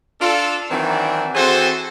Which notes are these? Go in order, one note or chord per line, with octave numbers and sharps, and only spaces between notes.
D4 F4 A4
D#3 E3 F#3 C4 D4
E3 C4 F#4 G#4 A4 C5